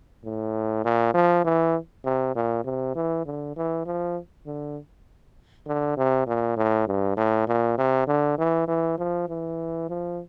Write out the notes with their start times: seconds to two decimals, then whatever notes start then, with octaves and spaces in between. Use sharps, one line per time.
0.24 A2
0.85 A#2
1.14 F3
1.45 E3
2.05 C3
2.36 A#2
2.65 C3
2.95 E3
3.26 D3
3.56 E3
3.86 F3
4.46 D3
5.67 D3
5.97 C3
6.27 A#2
6.57 A2
6.87 G2
7.17 A2
7.48 A#2
7.78 C3
8.08 D3
8.38 E3
8.68 E3
8.98 F3
9.29 E3
9.90 F3